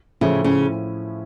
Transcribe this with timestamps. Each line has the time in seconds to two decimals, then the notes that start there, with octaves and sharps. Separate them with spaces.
0.21 A2 C#3 F3 C#4 E4
0.44 C#3